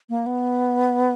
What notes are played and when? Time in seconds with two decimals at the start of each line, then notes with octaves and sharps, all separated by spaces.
0.09 A#3
0.26 B3